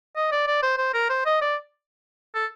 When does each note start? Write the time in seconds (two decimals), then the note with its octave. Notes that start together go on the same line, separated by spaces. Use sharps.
0.16 D#5
0.32 D5
0.47 D5
0.63 C5
0.78 C5
0.94 A#4
1.10 C5
1.26 D#5
1.41 D5
2.35 A4